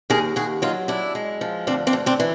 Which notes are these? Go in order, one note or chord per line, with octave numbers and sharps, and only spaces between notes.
D#2 G#4 A#4
D#2 F#4 G#4
F#3 D#4 F4
F#2 D4 E4
G#3
F3
D2 C4 D4
C4 D4
D2
C4 D4
E3